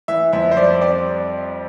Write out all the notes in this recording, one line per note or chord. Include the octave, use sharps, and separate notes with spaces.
E3 E5
F2 E5
C5
G3 D5
C4 D5